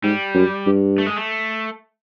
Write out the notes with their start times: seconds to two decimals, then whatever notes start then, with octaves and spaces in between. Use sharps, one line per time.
0.03 G#2 G3
0.35 F#2
0.67 G2
0.98 A3
1.07 G#3
1.16 A3